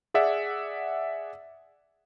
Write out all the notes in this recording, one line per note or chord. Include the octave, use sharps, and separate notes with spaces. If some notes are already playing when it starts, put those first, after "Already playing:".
G#4 D5 E5 F#5